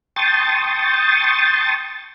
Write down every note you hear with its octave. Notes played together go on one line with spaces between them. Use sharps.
G5 A5 C6 C#6 D#6 A6